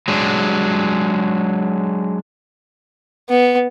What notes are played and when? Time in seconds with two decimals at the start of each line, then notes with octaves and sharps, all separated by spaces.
0.08 F#3 G#3 D4
3.30 B3